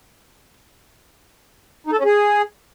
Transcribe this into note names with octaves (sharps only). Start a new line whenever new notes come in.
D#4
A4
C#4
G#4